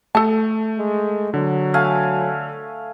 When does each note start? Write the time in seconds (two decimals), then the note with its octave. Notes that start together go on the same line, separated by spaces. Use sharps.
0.15 A3 A4 A5
0.79 G#3
1.34 D3 F#3
1.74 A3 F5 G#5